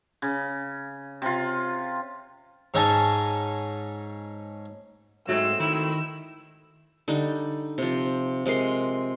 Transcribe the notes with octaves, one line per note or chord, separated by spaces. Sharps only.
C#3
C3 F4
G#2 C#4 D#4 E5 G#5 A5
G#2 F#3 A3 C4 E6
D#3 E4
D3 G3 D#4
C3 F3
C3 G#3 A#4 C6